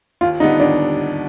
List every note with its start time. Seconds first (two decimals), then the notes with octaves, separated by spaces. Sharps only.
0.21 D#2 F4
0.40 D3 G3 B3 D4 D#4
0.60 D#2 D4